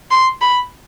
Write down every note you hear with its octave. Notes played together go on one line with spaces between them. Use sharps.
C6
B5